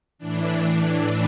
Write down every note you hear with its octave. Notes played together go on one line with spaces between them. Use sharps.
A2 E3 D4
D4